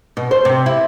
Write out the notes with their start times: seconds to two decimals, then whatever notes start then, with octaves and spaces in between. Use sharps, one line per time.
0.17 B2
0.31 C5
0.45 C3
0.66 E4